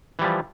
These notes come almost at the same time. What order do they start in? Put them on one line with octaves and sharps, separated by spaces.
E3 G3 F3